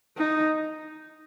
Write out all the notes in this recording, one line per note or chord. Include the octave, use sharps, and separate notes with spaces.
D#4